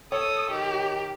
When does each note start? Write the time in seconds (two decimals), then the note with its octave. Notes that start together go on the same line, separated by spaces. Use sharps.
0.12 A4 C#5 D#6
0.50 D#3 G4